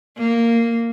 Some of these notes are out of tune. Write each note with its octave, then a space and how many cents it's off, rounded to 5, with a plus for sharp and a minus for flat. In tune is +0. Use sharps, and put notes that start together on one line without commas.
A#3 -10